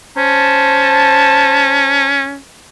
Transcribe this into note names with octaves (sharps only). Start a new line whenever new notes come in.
C#4 C5 A5